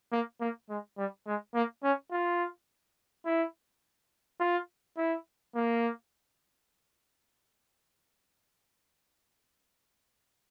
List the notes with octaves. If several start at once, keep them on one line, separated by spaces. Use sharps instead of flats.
A#3
A#3
G#3
G3
G#3
A#3
C#4
F4
E4
F4
E4
A#3